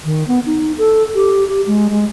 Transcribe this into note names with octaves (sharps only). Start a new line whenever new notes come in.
D#3
B3
D#4
A4
G4
G4
G#3
G#3